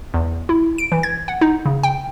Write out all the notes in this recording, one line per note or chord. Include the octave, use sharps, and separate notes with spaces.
E2
E4
D7
E3
G#6
F#5
D#4
C#3
G5